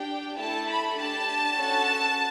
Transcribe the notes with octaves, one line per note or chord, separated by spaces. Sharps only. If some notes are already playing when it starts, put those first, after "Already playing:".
Already playing: D4 G4 G5
A3 E4 A4 A5
B5
D4 G4 A5
C#4 F#4 A4